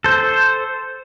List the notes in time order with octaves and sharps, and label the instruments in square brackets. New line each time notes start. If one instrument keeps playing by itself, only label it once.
[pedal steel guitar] A4 C5